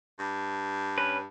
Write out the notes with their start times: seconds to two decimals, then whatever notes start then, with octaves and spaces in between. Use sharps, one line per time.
0.19 G2
0.98 C#4 B4